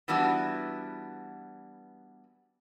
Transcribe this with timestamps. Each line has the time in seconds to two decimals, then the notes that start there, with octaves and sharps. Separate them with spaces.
0.08 E3 G3 B3 D4 E4 F#4